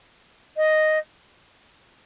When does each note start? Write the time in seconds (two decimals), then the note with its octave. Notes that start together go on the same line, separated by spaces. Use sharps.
0.57 D#5